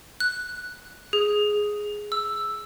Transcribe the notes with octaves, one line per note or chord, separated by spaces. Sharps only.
F#6
G#4
E6